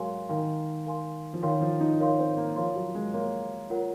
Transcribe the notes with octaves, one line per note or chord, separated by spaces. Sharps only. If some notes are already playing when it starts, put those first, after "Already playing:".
Already playing: F#3 G#3 A#4 F5 G#5 C6
D#3 A#4 F5 G#5 C6
A#4 F5 G#5 C6
F3
D#3 A#4 C#5 F5 C6
F3
D#4
A#4 C#5 F5 C6
C4
A#3
F3 A#4 C#5 F5 C6
F#3
G#3
A#3 A#4 C#5 F5 C6
F4 A#4 C#5 F#5